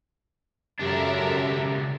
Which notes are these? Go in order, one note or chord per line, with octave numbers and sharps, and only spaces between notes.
C#2 F#2 D4 G4 A4 A#4 E5